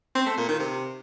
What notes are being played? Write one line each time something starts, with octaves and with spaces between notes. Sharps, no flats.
C4
A3
A#2
D#3
C3